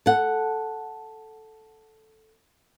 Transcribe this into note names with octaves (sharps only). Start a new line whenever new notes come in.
A4 F#5